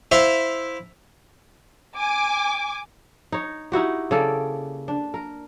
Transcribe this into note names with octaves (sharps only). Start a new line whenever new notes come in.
E4 C5 E5 F5
G#5 D6
D#4 C#5
D#4 E4 F#4 G4
C#3 A#3 A4 D5
D4
A#4